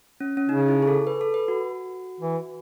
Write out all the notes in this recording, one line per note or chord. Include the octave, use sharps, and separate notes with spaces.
C#4
C#4
C#3 D#4
E4
G#4
A4
B4
A4
B4
F#4
E3